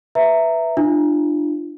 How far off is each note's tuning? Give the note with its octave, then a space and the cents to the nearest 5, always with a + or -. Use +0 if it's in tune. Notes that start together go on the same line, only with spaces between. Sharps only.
B4 +0 E5 +0 A#5 -15
D4 +30 F4 -25